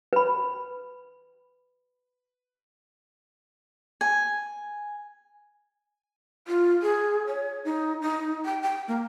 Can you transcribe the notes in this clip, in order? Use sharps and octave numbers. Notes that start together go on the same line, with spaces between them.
B4 B5
G#5
F4
G#4
C#5
D#4
D#4
G5
G5
A#3